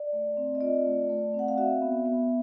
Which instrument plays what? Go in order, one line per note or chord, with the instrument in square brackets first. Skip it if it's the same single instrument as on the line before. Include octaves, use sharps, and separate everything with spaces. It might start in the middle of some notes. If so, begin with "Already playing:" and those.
Already playing: [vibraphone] D5
A3
C4
D#5
F4 D5
A3
A3
C4
F#5
F5
F#4 E5
B3
B3